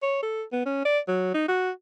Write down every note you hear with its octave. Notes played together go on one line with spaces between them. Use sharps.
C#5
A4
B3
C#4
D5
F#3
D#4
F#4